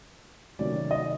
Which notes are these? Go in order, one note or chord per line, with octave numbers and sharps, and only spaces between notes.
C3 D#3 F#3 A3 C#4 D5
D#5